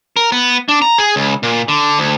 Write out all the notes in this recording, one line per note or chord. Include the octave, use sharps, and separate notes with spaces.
A#4
B3
D4
A#5
G#4
C#2
A#2
D3
D2